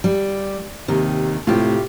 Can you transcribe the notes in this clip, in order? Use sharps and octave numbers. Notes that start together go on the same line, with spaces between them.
G3
D#2 C3 D#3
A2 C3 F4 G4